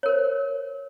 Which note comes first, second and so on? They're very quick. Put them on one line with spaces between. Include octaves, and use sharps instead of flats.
C#5 A#4 C5